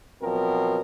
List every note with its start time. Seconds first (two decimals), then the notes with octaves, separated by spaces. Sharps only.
0.22 B2 F3 F#3 C4 A#4